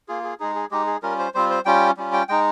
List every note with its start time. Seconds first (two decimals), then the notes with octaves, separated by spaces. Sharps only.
0.08 A#3 F4 G#4
0.24 G#4
0.40 G#3 D#4 G#4
0.55 G#4
0.71 G#3 D#4 G4
0.87 G#4
1.03 G3 C#4 F4 A#4
1.19 C5
1.34 G3 C4 F4 C5
1.50 C5
1.65 G3 C#4 F4 G5
1.97 G3 C#4 F4
2.13 G5
2.29 G#3 D#4 G5